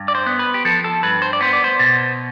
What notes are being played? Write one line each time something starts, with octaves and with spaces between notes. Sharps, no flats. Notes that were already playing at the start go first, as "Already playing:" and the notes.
Already playing: G2
D5
C5
B3
B4
G4
F3 A4
A4
G2 B4
C5
D5
B3 C5
D5
C5
B2